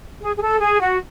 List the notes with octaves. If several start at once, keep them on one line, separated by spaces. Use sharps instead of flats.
G#4
G#4
A4
G#4
F#4